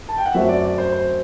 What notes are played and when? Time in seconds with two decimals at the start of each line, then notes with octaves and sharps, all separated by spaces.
0.09 A5
0.17 G5
0.26 F#5
0.34 F#2 F#3 A3 C4 F#4 E5
0.48 D5
0.64 D5
0.78 C5
0.92 C5